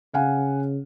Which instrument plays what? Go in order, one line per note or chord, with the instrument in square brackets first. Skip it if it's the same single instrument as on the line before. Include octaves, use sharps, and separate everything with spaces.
[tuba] C#3 [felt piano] F5 F#5 G#5